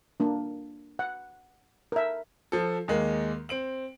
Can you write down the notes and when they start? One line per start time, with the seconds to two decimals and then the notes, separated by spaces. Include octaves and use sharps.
0.20 A#3 D4
0.99 F#5
1.92 A#4 E5
2.52 F3 A4
2.88 D#2 G#3 A#3
3.49 C4 D7 F#7